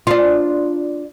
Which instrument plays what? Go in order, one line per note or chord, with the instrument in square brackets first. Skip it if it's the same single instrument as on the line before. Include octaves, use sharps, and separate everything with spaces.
[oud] D4 F4